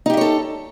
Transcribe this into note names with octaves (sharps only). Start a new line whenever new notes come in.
D#4 G4 A4 C#5 E5